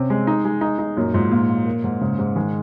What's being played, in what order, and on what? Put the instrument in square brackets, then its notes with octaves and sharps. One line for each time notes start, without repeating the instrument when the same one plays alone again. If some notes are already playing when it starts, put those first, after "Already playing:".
Already playing: [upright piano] C3 C#4
G#3
D#4
G#3
D#4
D#4
[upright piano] F#2 [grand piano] A#2
[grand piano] G#2 [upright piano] F3
[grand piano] A#2 [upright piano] F4
[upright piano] F4
A#3
G#2
[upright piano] G#2 [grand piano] C#3
[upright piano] G#2
[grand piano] D#3 [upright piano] G#3